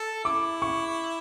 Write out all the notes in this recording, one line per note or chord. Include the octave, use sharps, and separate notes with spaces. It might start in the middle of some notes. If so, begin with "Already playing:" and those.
Already playing: A4
E4 D6
C#6